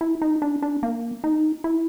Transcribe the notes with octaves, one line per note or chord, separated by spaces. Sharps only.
E4
D#4
D4
D4
A#3
D#4
E4